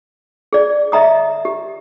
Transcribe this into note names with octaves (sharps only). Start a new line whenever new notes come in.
G#4 D5
D#5 E5 A#5 D#6
G4